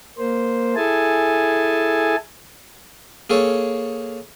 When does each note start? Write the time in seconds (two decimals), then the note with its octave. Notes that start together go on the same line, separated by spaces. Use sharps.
0.18 A#3 C5
0.76 E4 G#4 A4 G#5 A5
3.30 A#3 G#4 A4 C#5